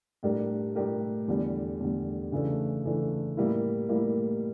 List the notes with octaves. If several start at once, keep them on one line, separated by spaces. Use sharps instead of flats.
A2 G3 D4 G4 A#4
A2 G3 D4 G4 A#4
E2 D3 G3
E2 D3 G3
C#3 E3 A3 D4
C#3 E3 A3 D4
A2 G3 A#3 E4
A2 G3 A#3 E4